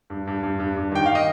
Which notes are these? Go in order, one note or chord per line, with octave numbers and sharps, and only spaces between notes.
G2
G2
G2
G2
G2
D#3 G5
F5
D#5